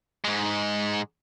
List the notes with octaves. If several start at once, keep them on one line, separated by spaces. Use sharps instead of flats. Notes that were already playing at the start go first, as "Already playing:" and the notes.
G#2 G#3